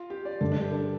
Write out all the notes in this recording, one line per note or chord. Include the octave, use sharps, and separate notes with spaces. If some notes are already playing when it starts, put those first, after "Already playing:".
Already playing: F4
G4
D5
G2 D3 A3 A4
D4
G4
A4